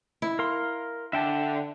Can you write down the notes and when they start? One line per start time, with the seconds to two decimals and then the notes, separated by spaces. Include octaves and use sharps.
0.22 E4
0.39 A#4 F5 C6
1.13 D3 E5 G5 A5